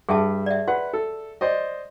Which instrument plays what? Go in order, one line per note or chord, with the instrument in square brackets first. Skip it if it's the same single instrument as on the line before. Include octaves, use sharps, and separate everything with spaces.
[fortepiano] G2 [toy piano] G#4 E5 A5
[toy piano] D5 E5
[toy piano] F#4 [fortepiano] B4 F#5
[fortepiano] A4
C5 D5 D#5